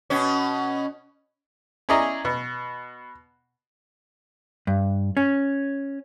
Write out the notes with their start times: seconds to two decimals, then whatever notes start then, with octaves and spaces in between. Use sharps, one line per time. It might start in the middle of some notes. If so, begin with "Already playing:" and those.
0.10 B2 C#4
1.89 C#4 E4 G#4 D5 D#5 A#5
2.25 B2
4.67 G2
5.17 C#4